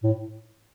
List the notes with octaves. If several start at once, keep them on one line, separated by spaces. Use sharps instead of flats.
A2